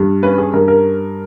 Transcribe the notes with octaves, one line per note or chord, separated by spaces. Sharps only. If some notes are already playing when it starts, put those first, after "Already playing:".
Already playing: G2 G3
C#4 B4
G#4
G2 A#4
A#4